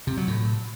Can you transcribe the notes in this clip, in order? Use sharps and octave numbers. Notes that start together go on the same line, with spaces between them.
C3
F#3
A2